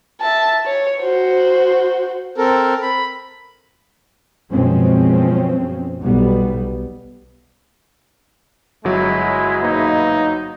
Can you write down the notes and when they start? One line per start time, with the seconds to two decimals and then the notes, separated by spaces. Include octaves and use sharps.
0.21 E5 A5
0.66 C#5
1.01 F#4 C5
2.36 C4 A4 A#4
2.82 B5
4.52 F#2 B2 F3 G#3 C4 C#4
6.01 B1 B2 G3 B3
8.85 G1 F#3 G#3 E4
9.62 G#2 B2 A#3 D#4